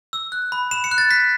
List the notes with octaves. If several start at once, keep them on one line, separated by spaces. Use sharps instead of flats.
E6
F#6
B5
B5 E7
C#7
F#6
A6
F#6 B6